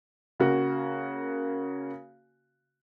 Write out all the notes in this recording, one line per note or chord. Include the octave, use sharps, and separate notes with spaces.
C#3 A#3 F#4